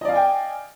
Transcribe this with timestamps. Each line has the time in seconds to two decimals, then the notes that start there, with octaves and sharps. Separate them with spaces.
0.01 D#5
0.05 D5
0.08 F5
0.12 G#5
0.15 G5